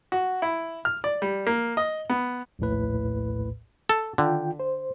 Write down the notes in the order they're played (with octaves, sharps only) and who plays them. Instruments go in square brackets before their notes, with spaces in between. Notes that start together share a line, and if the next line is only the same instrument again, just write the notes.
[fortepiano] F#4
E4
F6
D5
G3
A#3
D#5
B3
[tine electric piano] A#1 D#2 A2 B4
[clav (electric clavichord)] A4
[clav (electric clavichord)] D3 [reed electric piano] D#3 F4 G5
[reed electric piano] C5